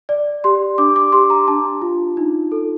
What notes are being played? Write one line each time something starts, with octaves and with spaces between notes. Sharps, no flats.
D5
G4 C6
D4 D6
D6
G4 C6
A#5
D4 A5
F4
D#4
A4